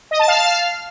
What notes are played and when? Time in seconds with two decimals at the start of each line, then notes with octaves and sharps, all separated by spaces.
0.11 D#5
0.19 A5
0.28 F5
0.36 A5
0.45 F5